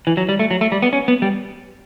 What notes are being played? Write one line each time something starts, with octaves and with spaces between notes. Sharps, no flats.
E3
F#3
G3
A3
F#3
A3
G3
B3
C#4
B3
G3